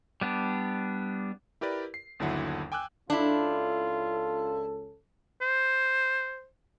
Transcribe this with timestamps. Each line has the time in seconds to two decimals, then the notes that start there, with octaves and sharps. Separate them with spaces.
0.21 G3 B3 D4
1.61 E4 G4 A#4 B4 D5
1.94 C7
2.19 G1 D#2 D3 F#3 E4 F#5
2.72 G5 G#5 D6 E6 F#6
3.10 C#2 C#4 D4 E4 F4 A4
5.41 C5